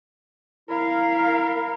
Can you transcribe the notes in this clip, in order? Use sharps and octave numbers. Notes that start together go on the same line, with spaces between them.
E4 A#4 F5